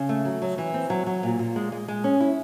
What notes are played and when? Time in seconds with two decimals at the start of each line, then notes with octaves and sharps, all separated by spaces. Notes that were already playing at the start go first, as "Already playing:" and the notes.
Already playing: C#3
0.09 A3
0.25 F#3
0.42 F#3
0.58 E3
0.74 C4
0.90 F#3
1.07 F#3
1.23 A#2
1.39 A#2
1.56 G#3
1.72 G#3
1.88 G#3
2.04 C#4
2.21 E4